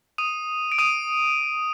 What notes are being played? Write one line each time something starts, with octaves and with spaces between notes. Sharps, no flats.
D#6 D#7
D7
D#6 D#7